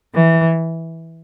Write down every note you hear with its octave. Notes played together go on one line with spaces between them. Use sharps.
E3